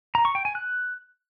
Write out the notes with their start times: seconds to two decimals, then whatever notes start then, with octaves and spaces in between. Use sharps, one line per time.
0.15 A#5
0.25 C#6
0.35 G5
0.45 G#5
0.55 F#6